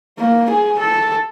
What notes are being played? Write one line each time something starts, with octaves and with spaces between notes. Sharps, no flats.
A#3
G#4
A4